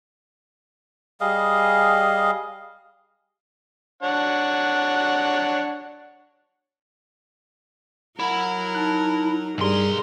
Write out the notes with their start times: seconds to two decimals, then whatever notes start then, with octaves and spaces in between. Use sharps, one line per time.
1.21 G3 G#4 D#5 F5
4.03 D4 C#5 F#5
8.19 F#3 E4 A#4 F#5
8.75 D#4 A5 F#6
9.58 B1 G2 G3 G#4 A#4 C6